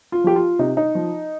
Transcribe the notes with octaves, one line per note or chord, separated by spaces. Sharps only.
F4
F3 G4
F4
C3 D#4
D#4
F3